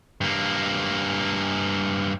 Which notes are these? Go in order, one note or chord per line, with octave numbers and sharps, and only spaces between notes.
G2 A#3